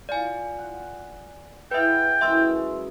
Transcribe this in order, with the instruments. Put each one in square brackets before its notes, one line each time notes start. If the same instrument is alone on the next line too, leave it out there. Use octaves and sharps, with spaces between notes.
[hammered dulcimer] F4 [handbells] D5 G#5
[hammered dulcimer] F#5
[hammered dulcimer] E4 G#4 F#5 [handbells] B4 E5 [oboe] G5
[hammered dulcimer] F#2 E3 G#3 [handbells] E5 C6 E6